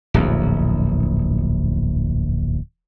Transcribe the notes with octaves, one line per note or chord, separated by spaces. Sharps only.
D1 A#1 E2